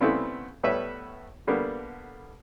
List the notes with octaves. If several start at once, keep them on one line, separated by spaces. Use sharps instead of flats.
C#3 G3 A3 B3 C4 E4
A2 G3 B3 B4 C#5 E5
D3 G3 A#3 B3